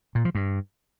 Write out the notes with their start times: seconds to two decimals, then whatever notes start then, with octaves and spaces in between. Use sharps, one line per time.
0.15 A#2
0.25 F3
0.35 G2